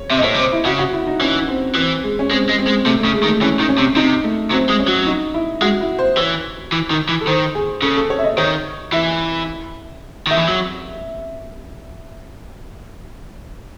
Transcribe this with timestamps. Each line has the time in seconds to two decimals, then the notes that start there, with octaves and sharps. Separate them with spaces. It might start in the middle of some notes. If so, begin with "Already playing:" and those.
Already playing: C#5
0.10 C3 E5
0.18 D#5
0.22 A2 C#5
0.34 C3 C5
0.52 E4
0.65 C#3 F#4
0.79 F#4
0.93 E4
1.07 D#4
1.21 E3 C#4
1.48 C4
1.75 E3 C4
2.03 G#3
2.19 C#4
2.31 G#3 C4
2.49 G#3
2.58 C4
2.67 G#3
2.86 C3 A3
3.00 A3
3.05 C#3
3.14 G#3
3.23 D#3
3.28 A3
3.41 E3 C#4
3.60 D#3
3.69 C#4
3.78 C3
3.96 C3 D#4
4.24 A3
4.51 F#3 C4
4.70 G#3
4.79 C#4
4.88 F#3
5.07 D#4
5.34 E4
5.62 G#3 F#4
5.81 E4
5.99 C5
6.17 E3 C#5
6.72 E3
6.91 D#3
7.09 E3
7.21 A4
7.27 D#3 C5
7.55 G#4
7.82 C#3 A4
7.97 A4
8.10 C#5
8.18 E5
8.24 D#5
8.38 D#3 C#5
8.92 E3 E5
10.27 D#3 E5
10.37 E3
10.48 F#3